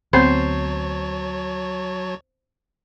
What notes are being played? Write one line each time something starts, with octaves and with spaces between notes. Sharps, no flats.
D2 F#3 B3 C4 C5 C#5 A5 B5